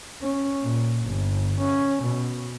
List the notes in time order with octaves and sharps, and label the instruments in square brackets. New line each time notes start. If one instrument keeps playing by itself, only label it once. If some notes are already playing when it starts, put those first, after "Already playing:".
[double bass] C#4
A#2
G1
C#4
B2